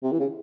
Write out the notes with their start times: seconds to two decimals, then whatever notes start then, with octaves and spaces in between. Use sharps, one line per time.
0.03 C3
0.12 E3
0.20 C#3